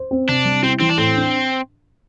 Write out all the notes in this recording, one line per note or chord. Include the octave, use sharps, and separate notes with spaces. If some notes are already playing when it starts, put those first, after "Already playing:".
Already playing: C5
C4
C3 D4
G3
C4 E4
E3 C4
D4
A2 C4
D4